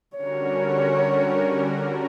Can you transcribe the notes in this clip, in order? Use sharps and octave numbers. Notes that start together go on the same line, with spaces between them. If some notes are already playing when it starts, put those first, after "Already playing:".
D3 G3 C#4 F#4 A#4 C#5